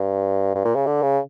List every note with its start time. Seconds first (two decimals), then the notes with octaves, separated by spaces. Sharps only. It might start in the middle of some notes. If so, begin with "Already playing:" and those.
Already playing: G2
0.55 G2
0.65 A#2
0.75 C#3
0.86 D3
1.02 C#3